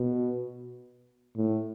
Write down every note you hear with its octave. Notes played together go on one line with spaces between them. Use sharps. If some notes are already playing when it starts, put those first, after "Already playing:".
Already playing: B2
A2